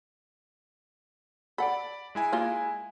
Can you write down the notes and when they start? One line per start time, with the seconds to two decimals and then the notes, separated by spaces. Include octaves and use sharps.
1.58 A4 D5 F#5 B5
2.15 G#3 E4 G#5
2.33 A#3 F4